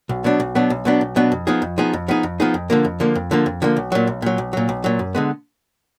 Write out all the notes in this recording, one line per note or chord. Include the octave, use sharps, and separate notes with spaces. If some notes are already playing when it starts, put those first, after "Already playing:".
B1
B2 F#3 B3 D4
B1
B2 F#3 B3 D4
B1
B2 F#3 B3 D4
B1
B2 F#3 B3 D4
F2
F3 B3 D#4 G#4
F2
F3 B3 D#4 G#4
F2
F3 B3 D#4 G#4
F2
F3 B3 D#4 G#4
F2
D3 F3 A#3
F2
D3 F3 A#3
F2
D3 F3 A#3
F2
D3 F3 A#3
B1
A#2 F#3
B1
A#2 F#3
B1
A#2 F#3
B1
A#2 F#3
F#2
D3 G#3 B3